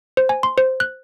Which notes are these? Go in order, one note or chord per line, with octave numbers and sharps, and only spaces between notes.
C5
G#5
C6
C5
F#6